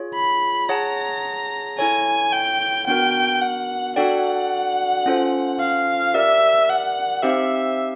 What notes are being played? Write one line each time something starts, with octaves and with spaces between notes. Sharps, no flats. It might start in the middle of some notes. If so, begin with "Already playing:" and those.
Already playing: F4 G#4 C#5
B5
G#4 C#5 F#5 A5 A#5
E4 A4 C#5 G#5
G5
B3 D4 F#4 A#4 G5
F#5
D4 F#4 A4 D5 F#5 G5
C#4 F4 A4 C5
F5
G4 A#4 D5 E5
F#5
C4 D#4 G4 C5 E5 F5